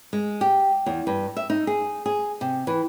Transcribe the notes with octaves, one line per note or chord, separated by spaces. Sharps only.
G#3
G4
E2
G2
E5
D#4
G#4
G#4
C3
E3